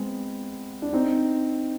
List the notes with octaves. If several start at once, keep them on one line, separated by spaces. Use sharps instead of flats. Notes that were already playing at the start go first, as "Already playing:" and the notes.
Already playing: G#3 B3 C4
D4
C4 D#4